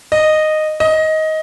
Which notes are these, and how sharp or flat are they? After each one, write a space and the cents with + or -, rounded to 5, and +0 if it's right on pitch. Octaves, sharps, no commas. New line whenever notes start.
D#5 -10
D#5 +15